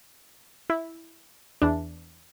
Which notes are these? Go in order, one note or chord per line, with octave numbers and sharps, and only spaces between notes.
E4
E2 E3 D4